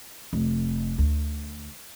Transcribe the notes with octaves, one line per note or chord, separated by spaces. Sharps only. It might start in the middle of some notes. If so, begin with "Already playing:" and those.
F1
D2